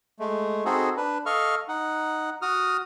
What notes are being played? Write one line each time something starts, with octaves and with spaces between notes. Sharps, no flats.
G#3 A3
C4 D#4 F#4 G#4 A4
D4 B4
A4 D#5 F5 C#6 F6
D#4 F#5
F#4 D#6 F6